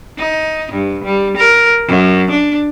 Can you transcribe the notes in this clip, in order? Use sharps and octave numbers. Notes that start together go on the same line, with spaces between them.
D#4
G2
G3
A#4
F#2
D4